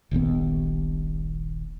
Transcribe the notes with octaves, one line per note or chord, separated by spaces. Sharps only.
D#1 A#1 D#2 B3